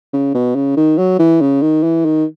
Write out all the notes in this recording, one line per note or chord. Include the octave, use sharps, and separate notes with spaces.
C#3
B2
C#3
D#3
F#3
E3
C#3
D#3
E3
D#3